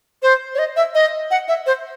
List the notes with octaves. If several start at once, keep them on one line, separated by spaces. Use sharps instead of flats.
C5
C#5
D#5
E5
D#5
F#5
E5
C5